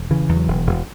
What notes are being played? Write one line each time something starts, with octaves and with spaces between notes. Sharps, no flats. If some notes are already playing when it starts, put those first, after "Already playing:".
Already playing: E1
C#3 E3
E2
F#3
E1
E1